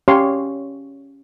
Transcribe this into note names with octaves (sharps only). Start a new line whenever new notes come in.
C#4 G4 C#5 F5 C6